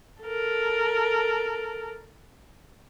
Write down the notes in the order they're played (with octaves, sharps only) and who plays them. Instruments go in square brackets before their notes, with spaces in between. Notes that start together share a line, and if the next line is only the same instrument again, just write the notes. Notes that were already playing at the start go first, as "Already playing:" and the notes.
[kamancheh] A4 A#4